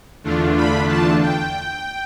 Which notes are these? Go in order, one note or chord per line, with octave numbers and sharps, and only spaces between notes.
E2 D3 A3 D4 F4
B5
A5
G5